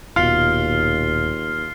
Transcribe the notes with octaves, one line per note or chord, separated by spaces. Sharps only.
D#1 D#2 B2 F4 F6 C7